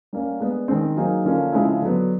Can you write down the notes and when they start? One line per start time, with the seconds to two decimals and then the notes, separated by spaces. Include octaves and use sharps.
0.13 G3 A#3 C#4
0.40 G#3 B3 D4
0.68 D#3 G#3 C4
0.96 F#3 A#3 D#4 G#4
1.25 D3 F3 A#3 C#4
1.53 C#3 F3 G#3 C4 E4
1.82 D3 F#3 B3